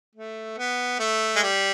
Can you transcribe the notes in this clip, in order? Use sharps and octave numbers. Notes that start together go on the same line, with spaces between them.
A3
B3
A3
G#3
G3